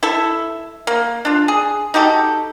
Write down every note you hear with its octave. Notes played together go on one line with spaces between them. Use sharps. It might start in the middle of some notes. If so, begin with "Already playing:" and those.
E4 A4 E5
A#3
D4 F4
G#4
D#4 F#4 G4 A4